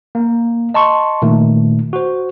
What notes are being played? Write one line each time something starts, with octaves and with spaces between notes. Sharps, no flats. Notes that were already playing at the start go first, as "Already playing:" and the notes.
A#3
D#5 A5 C6 C#6
A#2 D#3 A3
F#4 C5